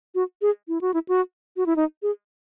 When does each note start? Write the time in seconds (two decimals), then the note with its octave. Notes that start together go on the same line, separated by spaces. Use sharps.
0.15 F#4
0.42 G#4
0.68 E4
0.81 F#4
0.94 E4
1.09 F#4
1.57 F#4
1.66 E4
1.76 D#4
2.03 G#4